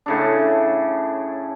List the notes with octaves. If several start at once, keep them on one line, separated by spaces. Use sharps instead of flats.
A2 C#3 D4